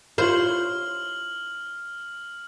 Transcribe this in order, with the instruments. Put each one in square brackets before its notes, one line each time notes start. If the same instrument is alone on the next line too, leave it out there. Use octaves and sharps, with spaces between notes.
[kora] E4 F4 C#5 [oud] C5 [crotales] F6 F#7